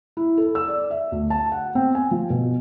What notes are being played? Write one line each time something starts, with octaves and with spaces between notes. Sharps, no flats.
E4
A4
E6
D5
E5
D2
A5
F#5
C4
G#5
F3
B2